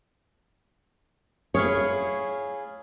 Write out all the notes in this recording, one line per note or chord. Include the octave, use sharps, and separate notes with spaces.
E4 F4 G#4 C#5